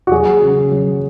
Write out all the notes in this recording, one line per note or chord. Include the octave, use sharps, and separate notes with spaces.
F#4
F#3 G#4
C#3
F#3